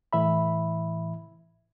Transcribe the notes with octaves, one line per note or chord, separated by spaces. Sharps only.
A2 E3 E5 B5